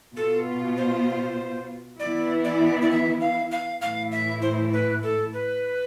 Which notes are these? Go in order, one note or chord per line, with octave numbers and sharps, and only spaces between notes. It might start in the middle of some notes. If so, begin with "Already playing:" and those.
B2 B3 F4 A4
C5
E3 B3 E4 D5
D5
D5
E5
F5
F5
A2 E3 A3 E4 F5
E5
C5
B4
A4
B4